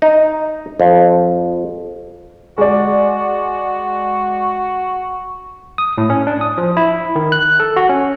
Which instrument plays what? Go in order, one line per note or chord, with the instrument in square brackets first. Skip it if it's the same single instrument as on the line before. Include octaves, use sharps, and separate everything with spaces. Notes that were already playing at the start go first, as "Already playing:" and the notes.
[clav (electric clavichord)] D#4
F2
[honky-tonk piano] G#3 D5 [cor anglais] F#4
[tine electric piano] D#6
A2
C#4
D4
D#6
F3
E4
D#3
F#6
A4
F#4
C#4